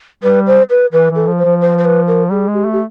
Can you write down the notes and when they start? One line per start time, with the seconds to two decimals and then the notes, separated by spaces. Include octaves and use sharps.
0.23 G3 B4
0.47 C5
0.70 B4
0.93 E3 B4
1.10 E3
1.16 A4
1.27 F3
1.38 C5
1.45 F3
1.61 C5
1.78 C5
1.85 B4
2.07 A#4
2.30 G3 G#4
2.48 G#3
2.54 G4
2.65 A3
2.73 G4